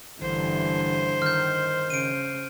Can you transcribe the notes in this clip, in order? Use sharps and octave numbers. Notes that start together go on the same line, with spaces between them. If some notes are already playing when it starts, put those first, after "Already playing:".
A1 G2 D3 E3 C5
D#3 F6 G6
C#3 D7 D#7